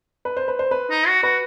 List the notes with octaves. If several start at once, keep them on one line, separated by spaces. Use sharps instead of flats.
B4
C5
B4
C5
B4
D#4
F#4
F#4 B4